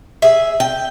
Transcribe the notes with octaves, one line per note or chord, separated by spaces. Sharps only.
G#4 E5
G5